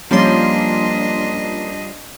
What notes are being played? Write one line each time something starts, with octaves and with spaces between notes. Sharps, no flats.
F3 G3 A#3 C#4 D4 F4 D#5 C6